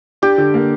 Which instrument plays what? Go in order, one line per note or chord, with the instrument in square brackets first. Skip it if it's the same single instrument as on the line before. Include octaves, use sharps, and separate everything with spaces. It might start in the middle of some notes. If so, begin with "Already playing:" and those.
[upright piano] D4 [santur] G4
[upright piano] D3
A#3